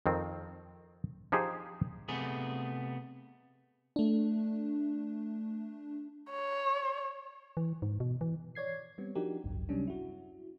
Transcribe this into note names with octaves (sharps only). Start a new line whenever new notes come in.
F2 D#3 C4
F3 D#4 G4 G#4 C5
C3 A3 B3 G#4
A3 D4
C#5
E3
G#2
B2
E3
C#5 D5 G#6 C7
G3 B3 C4
F3 D4 D#4 F#4 G4 A#4
G#1 C#2 F#2
C3 F#3 G3 C#4 D4
E4 F#4